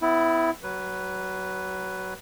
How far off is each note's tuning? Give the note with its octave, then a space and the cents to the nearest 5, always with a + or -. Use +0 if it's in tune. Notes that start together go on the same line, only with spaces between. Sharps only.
B3 +40 E4 +0
F#3 +25 B4 +0